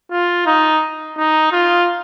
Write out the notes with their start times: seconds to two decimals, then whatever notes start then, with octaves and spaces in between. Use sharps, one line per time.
0.11 F4
0.46 D#4
1.18 D#4
1.52 F4